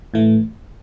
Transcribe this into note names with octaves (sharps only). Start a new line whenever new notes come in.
A2 E3 A3